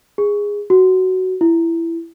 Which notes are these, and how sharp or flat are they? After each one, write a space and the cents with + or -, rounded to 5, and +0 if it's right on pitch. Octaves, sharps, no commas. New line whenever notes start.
G#4 -15
F#4 +10
E4 +15